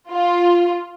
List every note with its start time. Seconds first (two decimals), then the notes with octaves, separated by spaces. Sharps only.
0.12 F4